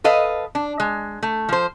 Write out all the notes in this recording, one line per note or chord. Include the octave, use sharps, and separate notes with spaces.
A4 B4 D#5 F5
D4
G#3
A3
F3 C5